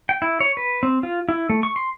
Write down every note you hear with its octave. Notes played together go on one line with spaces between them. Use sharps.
G5
E4
C#5
B4
C4
F4
E4
A3
C#6
C6